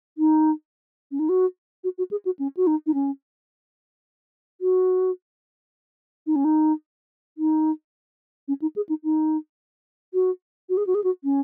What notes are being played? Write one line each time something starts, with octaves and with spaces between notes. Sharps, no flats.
D#4
C#4
D#4
F#4
F#4
F#4
G#4
F#4
C#4
F#4
D#4
D#4
C#4
F#4
D#4
C#4
D#4
D#4
C#4
D#4
G#4
D#4
D#4
F#4
F#4
G#4
F#4
G#4
F#4
C#4